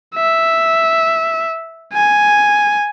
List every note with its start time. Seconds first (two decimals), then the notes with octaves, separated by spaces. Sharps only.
0.16 E5
1.93 G#5